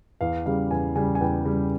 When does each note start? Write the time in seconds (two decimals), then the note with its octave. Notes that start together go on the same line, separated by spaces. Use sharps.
0.21 E2 F5
0.46 C#3 G3 F5
0.71 E2 G#5
0.95 C#3 G3 G#5
1.15 G#5
1.21 E2 G5
1.45 C#3 G3